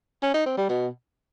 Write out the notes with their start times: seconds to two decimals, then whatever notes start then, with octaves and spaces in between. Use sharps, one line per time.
0.23 C#4
0.34 D#4
0.46 C4
0.58 G3
0.69 B2